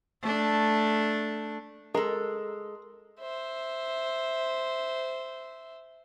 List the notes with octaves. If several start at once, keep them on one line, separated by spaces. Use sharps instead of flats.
A3 D4
G#3 A4 A#4
C5 E5